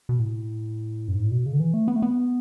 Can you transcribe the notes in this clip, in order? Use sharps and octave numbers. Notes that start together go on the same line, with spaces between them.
B2
A2
F#2
G#2
A2
B2
C#3
D3
E3
A3
B3
A3
B3